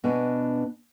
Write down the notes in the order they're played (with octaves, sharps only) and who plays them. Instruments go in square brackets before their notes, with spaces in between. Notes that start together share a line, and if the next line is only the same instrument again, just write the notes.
[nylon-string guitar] B2 B3 D4 G#5